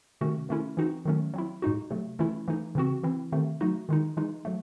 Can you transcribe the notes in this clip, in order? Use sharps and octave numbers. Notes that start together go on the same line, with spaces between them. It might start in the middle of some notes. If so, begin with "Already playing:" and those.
C3 D#3 A3 C#4 F#4
D#3 A3 C#4 E4
E3 C4 D#4 F#4
D#3 F#3 A3 C#4
F#3 C4 E4
A2 G#3 D#4 F#4
C3 F#3 A3
E3 A3 C#4 E4
E3 A3 D#4
C#3 E3 C4 F#4
E3 C4 E4
C3 D#3 A3 C4
F#3 A3 D#4 F#4
D#3 G#3 D#4
E3 G#3 D#4
F#3 A3